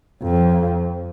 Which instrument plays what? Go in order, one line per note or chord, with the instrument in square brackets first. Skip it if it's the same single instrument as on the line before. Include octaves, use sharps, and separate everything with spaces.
[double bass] F2